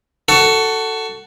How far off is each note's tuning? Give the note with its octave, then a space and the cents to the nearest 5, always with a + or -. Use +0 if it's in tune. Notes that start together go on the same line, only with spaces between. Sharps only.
F#4 +15 A4 +10